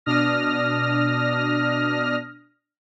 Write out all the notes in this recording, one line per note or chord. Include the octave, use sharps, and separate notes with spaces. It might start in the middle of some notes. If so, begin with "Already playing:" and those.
B2 D4 D#6 F6 A#6